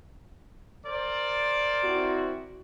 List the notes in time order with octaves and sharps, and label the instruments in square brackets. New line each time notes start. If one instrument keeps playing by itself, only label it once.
[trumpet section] A#4 C5 D5
[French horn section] C4 E4 F#4